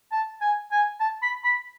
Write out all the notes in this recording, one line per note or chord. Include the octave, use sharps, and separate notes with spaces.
A5
G#5
G#5
A5
B5
B5